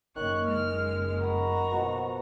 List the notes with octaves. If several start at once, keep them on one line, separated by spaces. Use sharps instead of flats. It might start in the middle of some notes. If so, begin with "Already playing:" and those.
F#1 F#2 D#3 A#3 C#5 F#6
F#1 G#3 F6
D#3 F#4 A#5 B5
B2 F3